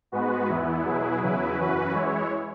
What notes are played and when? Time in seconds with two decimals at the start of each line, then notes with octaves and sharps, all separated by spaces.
0.12 G#2 G#3 B3 F#4 B4
0.49 E2 E3 B3 E4
0.84 B2 F#3 E4 G#4 B4
1.21 E2 C#3 F#3 E4 B4
1.57 F#2 E3 C#4 F#4 B4
1.92 E3 G#3 E4 C#5